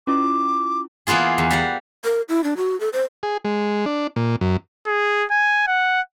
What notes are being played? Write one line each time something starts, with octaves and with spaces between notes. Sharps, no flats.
C#4 E4 F4 D6
E3 A#3 B3 F4 G#4
E2
G3 F5 F#5
A#4
E4
D4
F#4
A4
C5
G#4
G#3
D4
A#2
F#2
G#4
G#5
F#5